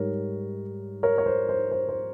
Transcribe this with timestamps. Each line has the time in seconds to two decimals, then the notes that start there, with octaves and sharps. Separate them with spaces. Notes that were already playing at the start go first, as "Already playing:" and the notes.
Already playing: G#2 G3 A#4 C#5
1.03 A#4 C#5
1.18 C#5
1.26 C5
1.49 C5
1.72 C5
1.89 C5